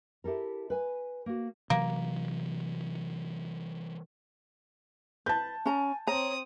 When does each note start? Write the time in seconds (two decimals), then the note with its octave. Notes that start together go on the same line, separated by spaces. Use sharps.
0.24 E4 G4 A4 A#4
0.70 B4 G#5
1.26 A#3 F#4
1.70 C3 E3 F#3 A#3
5.26 B4 A5 G6
5.66 C#4 G#5 A#5
6.07 C4 C#5 A#5 D#6